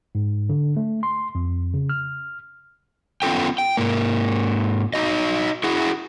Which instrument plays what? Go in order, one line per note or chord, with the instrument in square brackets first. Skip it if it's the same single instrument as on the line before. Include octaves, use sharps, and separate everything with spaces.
[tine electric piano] G#2
D3
A3
C6
F2
C#3
F6
[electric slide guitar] B3 C#4 F4 A4 G5
G5
G#2 A#3
D#4 F#4 D#5
E4 F#4 G#4